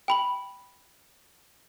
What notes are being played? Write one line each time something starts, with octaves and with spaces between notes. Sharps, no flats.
G5 B5 F#7